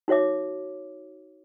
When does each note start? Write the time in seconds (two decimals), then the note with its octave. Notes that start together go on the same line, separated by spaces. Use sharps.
0.08 D#4 F#4 C#5 E5 D6